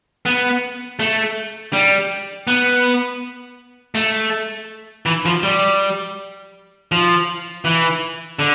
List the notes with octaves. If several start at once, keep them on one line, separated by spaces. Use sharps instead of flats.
B3
A3
G3
B3
A3
E3
F3
G3
F3
E3
D3